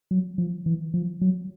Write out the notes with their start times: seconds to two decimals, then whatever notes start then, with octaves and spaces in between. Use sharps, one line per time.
0.11 F#3
0.38 F3
0.66 E3
0.94 F3
1.21 F#3